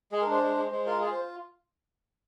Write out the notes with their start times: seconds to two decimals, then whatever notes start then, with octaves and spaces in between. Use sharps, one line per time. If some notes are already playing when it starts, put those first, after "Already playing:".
0.12 G#3 G#4
0.22 A#4
0.26 D4 C5
0.42 G#3
0.56 G#3
0.71 G#3 C5
0.86 F4 A#4
1.01 F4 G#4
1.12 C5